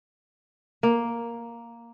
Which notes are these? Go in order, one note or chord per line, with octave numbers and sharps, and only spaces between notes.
A#3